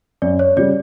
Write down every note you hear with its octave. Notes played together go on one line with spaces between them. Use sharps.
F#2 D5
C#5
C#3 G3 D5